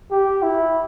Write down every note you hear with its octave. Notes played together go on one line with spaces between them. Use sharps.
G4
E4